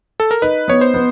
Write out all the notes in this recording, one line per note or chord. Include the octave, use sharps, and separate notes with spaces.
A4
A#4
D#4 B4
B3 C#5
C5
B3